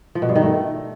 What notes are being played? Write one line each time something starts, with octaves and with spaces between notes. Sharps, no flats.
F3
B2
G2
D#3
A3